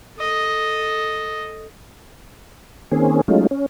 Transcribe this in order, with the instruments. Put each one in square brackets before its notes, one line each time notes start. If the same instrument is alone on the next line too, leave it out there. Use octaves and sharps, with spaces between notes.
[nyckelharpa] A4 D#5
[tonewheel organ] D#3 A#3 C4 C#4 G#4
F#3 G#3 A3 C#4 D#4 F4
C#4